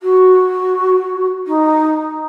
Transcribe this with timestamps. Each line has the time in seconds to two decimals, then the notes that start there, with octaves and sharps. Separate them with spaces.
0.01 F#4
1.47 D#4